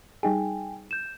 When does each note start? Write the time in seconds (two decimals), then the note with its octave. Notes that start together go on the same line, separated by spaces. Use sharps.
0.23 G3 D#4 G#4 G5 G#5
0.91 G6 E7